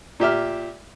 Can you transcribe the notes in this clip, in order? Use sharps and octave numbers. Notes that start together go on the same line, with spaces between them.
A#2 G4 E5 F6